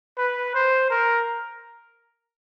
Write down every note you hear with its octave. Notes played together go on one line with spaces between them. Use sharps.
B4
C5
A#4